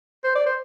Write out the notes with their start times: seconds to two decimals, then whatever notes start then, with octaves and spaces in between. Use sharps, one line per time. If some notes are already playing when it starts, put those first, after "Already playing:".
0.24 C5
0.35 D5
0.46 C5